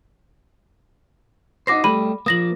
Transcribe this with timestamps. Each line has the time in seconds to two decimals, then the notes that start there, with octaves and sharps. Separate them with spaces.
1.67 D#4 F#4 C5 D6 A#6 C7
1.84 G3 A3 G4 B5 D#7
2.26 F3 A#3 D#6 A#6 F#7